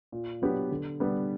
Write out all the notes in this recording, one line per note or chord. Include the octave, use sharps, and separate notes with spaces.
A#2
F#3 B3 D4 G4
D3
G3 B3 D4